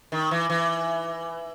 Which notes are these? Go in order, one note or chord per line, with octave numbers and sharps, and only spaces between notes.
D#3
E3
E3